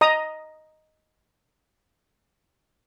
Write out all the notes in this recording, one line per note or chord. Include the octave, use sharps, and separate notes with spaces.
D#5 A#5 D#6